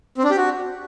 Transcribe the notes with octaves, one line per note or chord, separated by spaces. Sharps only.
C4
D4
G4
F#4